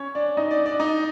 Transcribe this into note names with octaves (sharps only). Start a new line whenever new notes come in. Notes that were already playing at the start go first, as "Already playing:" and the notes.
Already playing: C#4 C#5
D4 D5
D#4 D#5
D4 D5
D4 D5
D#4 D#5